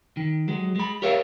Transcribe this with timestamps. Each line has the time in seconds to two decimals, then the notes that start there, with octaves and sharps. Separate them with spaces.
0.17 D#3
0.48 F#3 G#3
0.76 G#3 B5
1.02 G4 A#4 C#5 E5 F5